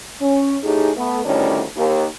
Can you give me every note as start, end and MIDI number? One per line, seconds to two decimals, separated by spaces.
0.21 0.57 61
0.64 0.90 45
0.64 0.90 63
0.64 0.90 67
0.64 0.90 68
0.97 1.23 57
0.97 1.23 59
1.25 1.63 38
1.25 1.63 45
1.25 1.63 51
1.25 1.63 55
1.25 1.63 61
1.25 1.63 62
1.76 2.05 39